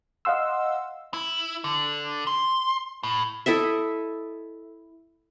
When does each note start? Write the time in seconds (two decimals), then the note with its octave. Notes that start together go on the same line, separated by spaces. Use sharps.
0.25 D#5 F5 F#5 C6 E6
1.14 E4
1.64 D3
2.27 C6
3.03 A2
3.46 E4 A4 D#5 E5